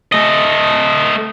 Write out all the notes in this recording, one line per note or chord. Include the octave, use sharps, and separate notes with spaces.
A3 D#5